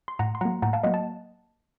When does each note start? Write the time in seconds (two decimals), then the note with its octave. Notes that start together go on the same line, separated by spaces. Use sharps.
0.08 C6
0.19 A2 F#5 A#5
0.35 C6
0.41 F#3 F#5 A#5
0.45 A#3
0.62 A2 F#5 A#5
0.73 F5 A5
0.83 F#3 A#3 D#5 F#5
0.94 A5